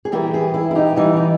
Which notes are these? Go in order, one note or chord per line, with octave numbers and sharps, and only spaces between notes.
G#4
E3 G3 B3 G4 A#4
G#4 B4
E4
E4
D#4 G4
E3 G3 B3 D#4
D#4